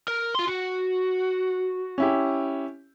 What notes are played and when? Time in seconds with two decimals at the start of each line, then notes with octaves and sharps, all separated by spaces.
0.08 A#4
0.35 F4 C6
0.48 F#4
1.98 C#4 E4 G4